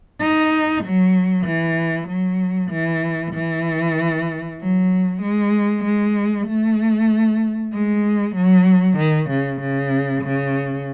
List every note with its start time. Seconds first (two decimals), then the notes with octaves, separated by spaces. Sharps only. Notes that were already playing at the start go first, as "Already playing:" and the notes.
0.21 D#4
0.84 F#3
1.46 E3
2.08 F#3
2.71 E3
3.34 E3
4.60 F#3
5.22 G#3
5.84 G#3
6.47 A3
7.73 G#3
8.36 F#3
8.98 D#3
9.29 C#3
9.61 C#3
10.24 C#3